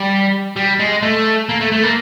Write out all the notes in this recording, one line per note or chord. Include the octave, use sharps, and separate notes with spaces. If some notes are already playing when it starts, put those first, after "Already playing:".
Already playing: G3
G3
G#3
A3
A#3
A3
A3
A#3